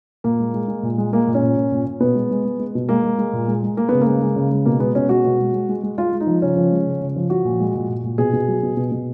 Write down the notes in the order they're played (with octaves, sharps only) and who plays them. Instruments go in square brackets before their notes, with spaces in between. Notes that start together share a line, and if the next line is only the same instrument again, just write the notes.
[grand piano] A#2 A#3
G#3
G#3
G#3
A#2
G#3
G#3 A#3
A#2
C#4
A#2
A#2
A#2
A#2
B2 B3
G#3
G#3
G#3
G#3
B2
G#3 A#3
G#3
G#3
A#2
G#3
G#3
G#3 A#3
C#3 B3
A#3
G#3
G#3
C#3
G#3
B2 A#3
G#3 B3
B2 C#4
G#3 F#4
B2
G#3
G#3
G#3
G#3
G#3 F4
G#3
D#4
F3
C#3 C#4
F3
G#3
C#3
C#3
F3
F3 F#4
A#2
G#3
A#2
A#2
A#2
B2 G#4
B2
F#3
B2
B2
B2